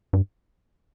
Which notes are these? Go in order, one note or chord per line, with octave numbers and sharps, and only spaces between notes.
G2